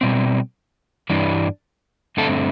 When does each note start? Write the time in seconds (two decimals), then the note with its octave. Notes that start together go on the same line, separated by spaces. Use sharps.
0.01 B2 G3 C4
1.10 G2 E3 G3 D4
2.17 G2 D3 A3 C4 A4